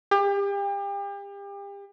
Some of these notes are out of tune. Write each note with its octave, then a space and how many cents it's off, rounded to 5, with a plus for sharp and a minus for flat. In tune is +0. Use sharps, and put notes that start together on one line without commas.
G4 +35